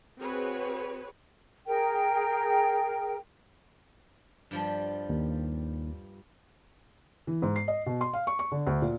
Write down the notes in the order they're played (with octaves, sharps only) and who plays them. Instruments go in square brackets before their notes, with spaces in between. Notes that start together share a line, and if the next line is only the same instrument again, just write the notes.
[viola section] C4 F#4 G#4 B4 C#5
[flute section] G#4 A#4 G5
[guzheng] G2 F3 G3
[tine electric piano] D#2
[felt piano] E3
G#2
C7
D#5
B2
C6
F5
C#6
C#6
D3
D2
A#2